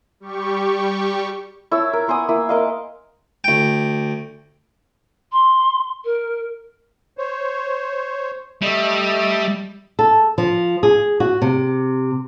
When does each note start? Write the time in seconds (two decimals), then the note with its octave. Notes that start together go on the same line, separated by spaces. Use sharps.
0.20 G3 G4 C#6
1.71 E4 C#5 A5 E6
1.93 A#4
2.08 B3 C5 G#5 D#6
2.29 A#3 E4
2.49 A#4 D#5 F5
3.44 D2 G5
5.32 C6
6.05 A#4
7.18 C5 C#5
8.62 G3 A3 D#5 E5
9.99 A4
10.38 F3
10.83 G#4
11.20 F#4
11.42 C3